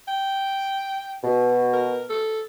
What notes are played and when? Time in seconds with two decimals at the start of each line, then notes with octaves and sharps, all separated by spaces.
0.08 G5
1.24 B2
1.73 A#4
2.10 A4